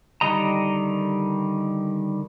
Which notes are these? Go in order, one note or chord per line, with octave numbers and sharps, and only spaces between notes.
D3 D#3 G3 D#5 A#5